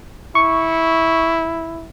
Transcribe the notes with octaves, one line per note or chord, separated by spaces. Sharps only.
E4 C#6